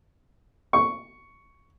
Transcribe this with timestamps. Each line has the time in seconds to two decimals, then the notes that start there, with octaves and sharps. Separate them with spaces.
0.73 C#6